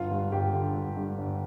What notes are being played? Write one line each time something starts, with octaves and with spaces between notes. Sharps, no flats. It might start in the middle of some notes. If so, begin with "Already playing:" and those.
Already playing: G1 F4
G2
G1 G4
D3
G1
G2
G1